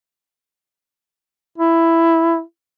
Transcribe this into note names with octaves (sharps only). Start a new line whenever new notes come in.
E4